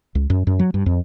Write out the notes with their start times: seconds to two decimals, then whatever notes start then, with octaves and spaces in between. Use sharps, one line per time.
0.15 C#2
0.30 F#2
0.47 F#2
0.59 F#3
0.74 G2
0.86 F2